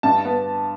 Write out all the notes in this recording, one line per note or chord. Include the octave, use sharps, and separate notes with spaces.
G2 A5
B3